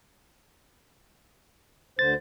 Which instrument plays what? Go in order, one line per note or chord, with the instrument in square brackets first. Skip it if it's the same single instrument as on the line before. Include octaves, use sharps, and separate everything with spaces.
[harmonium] D2 D3 C5 [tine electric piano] A6